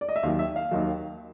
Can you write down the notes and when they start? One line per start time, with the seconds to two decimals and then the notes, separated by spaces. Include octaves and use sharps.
0.01 D5
0.09 D#5
0.16 E5
0.23 D#2 D#3 F#3 F5
0.39 E5
0.56 F5
0.71 D#2 D#3 F#3